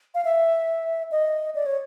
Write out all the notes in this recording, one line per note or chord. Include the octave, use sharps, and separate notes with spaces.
F5
E5
D#5
D5
C#5